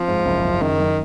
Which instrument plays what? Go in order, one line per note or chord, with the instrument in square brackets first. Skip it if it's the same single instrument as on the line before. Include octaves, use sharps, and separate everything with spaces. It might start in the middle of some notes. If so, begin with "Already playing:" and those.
Already playing: [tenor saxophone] F3 [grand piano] C4
[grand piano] G#2
F#1
F#1
[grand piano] F#2 [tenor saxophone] D#3
[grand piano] F#2